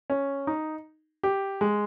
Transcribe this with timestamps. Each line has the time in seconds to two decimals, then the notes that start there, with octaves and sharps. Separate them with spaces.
0.10 C#4
0.47 D#4
1.23 G4
1.61 G#3